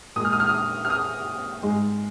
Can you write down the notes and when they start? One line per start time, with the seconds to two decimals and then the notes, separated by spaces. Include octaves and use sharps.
0.16 A#2 G#3 D#6
0.25 F6
0.33 D#6
0.40 F6
0.49 D#6
0.85 F6
0.90 D#6
1.63 G#2 G#3